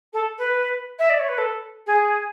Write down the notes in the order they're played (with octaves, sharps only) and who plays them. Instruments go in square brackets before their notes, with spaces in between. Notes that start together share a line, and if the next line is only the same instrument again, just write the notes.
[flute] A4
B4
E5
D5
C#5
B4
A4
G#4